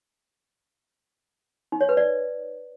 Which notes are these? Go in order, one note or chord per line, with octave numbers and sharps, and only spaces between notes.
D#4
C#5
B4
D5